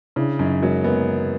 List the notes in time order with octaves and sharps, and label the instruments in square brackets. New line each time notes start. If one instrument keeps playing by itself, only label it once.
[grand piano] C#3 [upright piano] D4 E4
[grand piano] F#2 [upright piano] C#4 D#4
[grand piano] F#3 [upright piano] G#3 A#3
[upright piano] G#3 A#3 [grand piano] B3